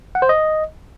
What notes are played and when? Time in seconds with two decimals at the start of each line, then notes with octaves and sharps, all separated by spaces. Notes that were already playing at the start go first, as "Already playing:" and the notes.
0.15 F#5
0.22 C5
0.29 D#5